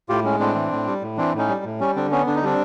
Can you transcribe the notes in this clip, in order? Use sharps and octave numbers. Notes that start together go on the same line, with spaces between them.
A2 F4 G4
G#3 C#4
A2 C4 D4
E3
A2
G3
A2
E3 C4 D4
A2 C#4 D#4
G3
A2
G3 C#4
D3 C4 D4
B3 C#4
D3 D4
D#4
G3 C4 D4